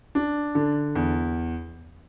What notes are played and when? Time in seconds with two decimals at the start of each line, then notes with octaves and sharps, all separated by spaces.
0.15 D4
0.55 D3
0.95 E2